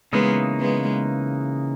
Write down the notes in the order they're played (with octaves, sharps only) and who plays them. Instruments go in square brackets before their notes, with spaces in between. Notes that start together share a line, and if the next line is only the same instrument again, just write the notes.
[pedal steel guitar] C#3 E3 A#3 D#4 [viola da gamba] G#3 B3
[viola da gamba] G#3 B3